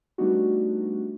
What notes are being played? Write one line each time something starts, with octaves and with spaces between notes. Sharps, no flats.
G3 A3 B3 D4 D#4 F#4